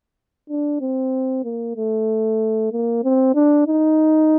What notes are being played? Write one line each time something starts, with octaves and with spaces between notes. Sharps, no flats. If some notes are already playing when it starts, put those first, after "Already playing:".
D4
C4
A#3
A3
A#3
C4
D4
D#4